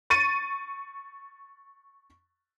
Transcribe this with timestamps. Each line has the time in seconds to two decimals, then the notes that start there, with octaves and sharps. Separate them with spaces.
0.10 C#6 A6 C#7 D#7